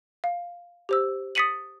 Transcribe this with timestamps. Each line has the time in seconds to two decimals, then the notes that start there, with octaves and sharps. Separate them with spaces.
0.24 F5
0.89 G4 C5 E6
1.35 D#6 A6 B6 C#7 D#7 F#7